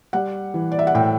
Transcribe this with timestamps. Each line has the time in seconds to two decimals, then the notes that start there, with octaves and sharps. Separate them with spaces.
0.13 G3 F#5
0.54 E3
0.72 D5
0.79 E5
0.87 F#5
0.94 A2 G5